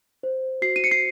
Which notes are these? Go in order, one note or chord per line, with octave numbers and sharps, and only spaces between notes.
C5
F#4 C7
D#7
C#7
C7